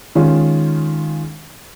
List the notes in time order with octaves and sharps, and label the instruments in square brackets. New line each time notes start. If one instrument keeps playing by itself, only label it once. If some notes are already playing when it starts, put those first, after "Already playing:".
[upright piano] D#3 G#3 C#4 F4